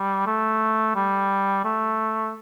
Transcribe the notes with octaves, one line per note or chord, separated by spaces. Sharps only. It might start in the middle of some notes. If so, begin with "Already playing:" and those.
Already playing: G3
A3
G3
A3